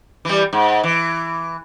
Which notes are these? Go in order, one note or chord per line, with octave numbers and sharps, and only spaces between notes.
E3 G3
G#2
E3